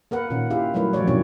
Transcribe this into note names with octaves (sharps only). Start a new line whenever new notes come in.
A#3 A#4 B4 F#5
A#2 D#3 C#4
E4 F4 G4 E5 F5
F#3 G3 A3 E4 A#4 B4
D#3 F3 F#3 A3 C#5 D5
B2 D#3 C4 C#4 E4 C#5